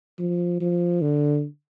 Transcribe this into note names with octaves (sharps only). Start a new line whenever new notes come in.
F3
F3
D3